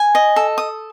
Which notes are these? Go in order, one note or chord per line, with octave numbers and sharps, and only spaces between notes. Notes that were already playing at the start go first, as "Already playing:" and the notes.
Already playing: G#5
D#5
A4
D#6